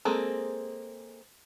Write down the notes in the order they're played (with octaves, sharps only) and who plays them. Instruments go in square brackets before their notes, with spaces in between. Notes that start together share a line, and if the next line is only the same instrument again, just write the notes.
[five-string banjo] G#3 A#3 C4 G#4 A4